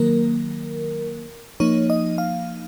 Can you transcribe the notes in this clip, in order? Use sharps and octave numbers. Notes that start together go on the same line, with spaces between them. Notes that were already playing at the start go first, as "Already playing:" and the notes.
Already playing: D#3 F#3 A#3 A#4
F3 A#3 D#4 C#5
D#5
F5